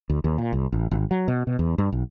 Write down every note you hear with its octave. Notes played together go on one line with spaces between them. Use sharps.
D2
D#2
A#2
C2
A1
G#1
F#3
B2
B2
E2
G2
B1